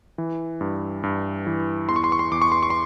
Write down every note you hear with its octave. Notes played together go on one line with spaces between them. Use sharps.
E3
G2
G2
E3
E2 C6
C#6
C6
C#6
C6
E2 D6
C#6
C6
C#6
C6